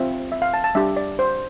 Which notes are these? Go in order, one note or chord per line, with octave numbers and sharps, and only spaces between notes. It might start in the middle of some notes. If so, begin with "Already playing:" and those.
Already playing: C4 F4 E5
E5
F5
A5
A5
G3 D4 G4 E5
D5
C5